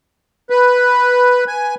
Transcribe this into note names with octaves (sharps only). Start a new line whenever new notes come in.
B4
G#5